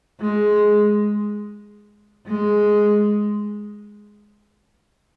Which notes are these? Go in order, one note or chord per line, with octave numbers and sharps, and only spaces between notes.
G#3
G#3